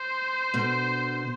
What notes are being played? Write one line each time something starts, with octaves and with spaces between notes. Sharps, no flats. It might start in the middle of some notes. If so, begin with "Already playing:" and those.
Already playing: C5
B2 D3